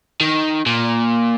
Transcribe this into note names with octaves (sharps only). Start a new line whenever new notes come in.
D#3
A#2